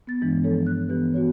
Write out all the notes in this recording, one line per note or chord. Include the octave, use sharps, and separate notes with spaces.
B3 A6
G2 E3 G#3 D4
F3 A4 C#5
F#6
E3 B3 G4 B4
B3 F#4 C#5